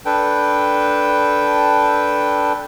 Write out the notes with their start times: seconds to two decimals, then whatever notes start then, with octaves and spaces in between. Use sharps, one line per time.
0.06 D4 A4 B4 G5